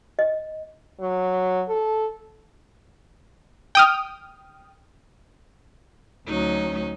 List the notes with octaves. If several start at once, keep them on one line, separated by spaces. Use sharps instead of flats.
D#5
F#3
A4
G5 D#6 F6
D2 F#3 C#4 D#4